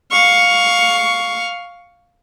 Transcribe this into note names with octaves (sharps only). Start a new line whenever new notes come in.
F5 C#6